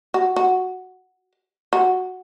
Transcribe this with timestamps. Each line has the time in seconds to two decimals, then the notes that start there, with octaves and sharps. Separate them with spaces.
0.14 F#4
0.36 F#4
1.73 F#4